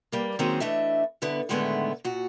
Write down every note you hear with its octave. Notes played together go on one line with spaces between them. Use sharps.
G2 G3 A#3
D#3 F#3 G#3 A#3 C4 C#4
E3 A3 D4 D#5 E5
G2 D3 B3 E4 B4
A2 D3 D#3 G#3 A3 B3
A#2 F#4